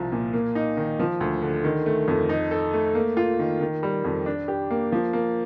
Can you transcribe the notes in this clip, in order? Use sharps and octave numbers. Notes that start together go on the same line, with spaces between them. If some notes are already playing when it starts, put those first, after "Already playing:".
Already playing: C2 F3
A#2
A#3
D#4
D#3
F3
D2
D3
D#3
A3
F2
D#4
A4
A3
A#3
F4
D#3
D#3
G3
F2
D4
G4
A#3
F3
A#3